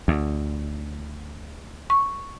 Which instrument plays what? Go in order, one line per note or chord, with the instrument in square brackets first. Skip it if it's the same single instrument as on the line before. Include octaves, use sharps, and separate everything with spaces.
[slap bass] D2
[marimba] C#6